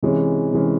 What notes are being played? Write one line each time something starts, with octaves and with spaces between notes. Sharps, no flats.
C3 E3 G#3 C#4
C3 E3 G#3 C#4